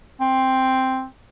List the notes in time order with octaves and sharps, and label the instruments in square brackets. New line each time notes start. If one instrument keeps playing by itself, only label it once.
[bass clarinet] C4